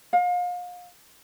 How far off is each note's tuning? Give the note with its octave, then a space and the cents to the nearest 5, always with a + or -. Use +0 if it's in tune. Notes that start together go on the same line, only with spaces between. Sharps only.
F5 +35